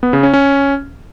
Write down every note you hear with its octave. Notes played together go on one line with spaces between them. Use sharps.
B3
C#3
C#4
C#4